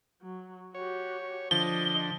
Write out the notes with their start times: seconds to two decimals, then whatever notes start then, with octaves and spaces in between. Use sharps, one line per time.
0.21 F#3
0.75 F#4 G4 C#5
1.51 D3 F3 D#5 G7